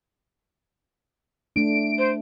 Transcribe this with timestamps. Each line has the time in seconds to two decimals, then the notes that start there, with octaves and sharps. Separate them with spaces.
1.56 A3 D4 D7
1.98 C5